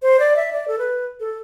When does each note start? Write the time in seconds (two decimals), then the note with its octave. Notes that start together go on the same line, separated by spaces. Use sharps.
0.02 C5
0.20 D5
0.36 E5
0.53 D5
0.68 A4
0.79 B4
1.20 A4